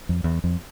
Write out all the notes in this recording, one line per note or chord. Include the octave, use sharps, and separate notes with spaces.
F2
E2
F2